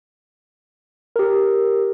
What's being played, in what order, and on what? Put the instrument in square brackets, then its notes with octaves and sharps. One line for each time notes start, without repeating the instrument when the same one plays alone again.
[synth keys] G4 A#4